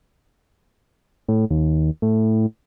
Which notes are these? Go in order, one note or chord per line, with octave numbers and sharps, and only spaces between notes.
A2
D#2
A2